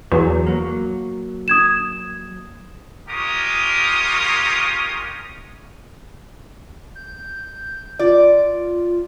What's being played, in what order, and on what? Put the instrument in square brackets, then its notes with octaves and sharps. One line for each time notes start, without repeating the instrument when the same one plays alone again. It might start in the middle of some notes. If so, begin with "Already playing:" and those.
[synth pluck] E2 [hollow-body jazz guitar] F#3
[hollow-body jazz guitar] F#3 A#3
[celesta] D#6 G#6 E7
[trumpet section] G#3 F4 G4 A#4 C#5 D#6
[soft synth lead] G6
[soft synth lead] F4 [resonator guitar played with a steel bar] D5